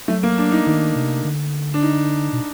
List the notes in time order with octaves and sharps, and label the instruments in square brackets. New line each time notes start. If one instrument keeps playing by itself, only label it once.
[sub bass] F#3 [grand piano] A3
[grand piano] A#3
D4
D#4
[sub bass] D#3 [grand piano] D#4
[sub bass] C3
D3
[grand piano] D4
D#4
[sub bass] B2